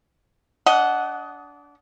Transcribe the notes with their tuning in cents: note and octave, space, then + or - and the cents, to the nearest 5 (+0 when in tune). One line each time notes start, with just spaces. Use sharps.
D4 -25 D#5 +10 F#5 +0